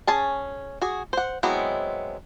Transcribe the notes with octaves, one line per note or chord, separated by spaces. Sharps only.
C#4 G#4 A5
F#4 G#4
C5 F#5
F#3 G#3 B3 C4 E4